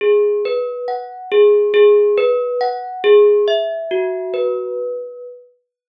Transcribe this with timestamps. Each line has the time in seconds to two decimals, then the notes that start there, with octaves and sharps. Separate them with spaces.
0.01 G#4
0.45 B4
0.88 F#5
1.32 G#4
1.74 G#4
2.18 B4
2.61 F#5
3.04 G#4
3.48 E5
3.91 F#4
4.34 B4